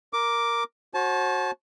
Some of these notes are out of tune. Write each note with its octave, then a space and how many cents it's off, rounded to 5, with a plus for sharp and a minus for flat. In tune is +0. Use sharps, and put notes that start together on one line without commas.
A#4 +0 D6 +0
F#4 +0 C5 +45 A5 -25